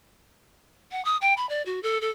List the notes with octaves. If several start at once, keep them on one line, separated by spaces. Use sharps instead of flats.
F#5
D#6
G5
B5
D5
F#4
A4
A4